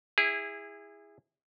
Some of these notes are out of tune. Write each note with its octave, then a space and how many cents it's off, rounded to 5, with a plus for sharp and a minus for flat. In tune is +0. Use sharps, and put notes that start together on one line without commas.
E4 +0 G#4 -25